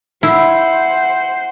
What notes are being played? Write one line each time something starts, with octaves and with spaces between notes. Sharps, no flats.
E4 C5 F#5